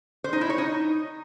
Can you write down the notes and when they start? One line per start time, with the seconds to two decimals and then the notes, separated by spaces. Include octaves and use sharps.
0.24 C5
0.33 D#4
0.41 E4
0.50 C#5
0.58 D#4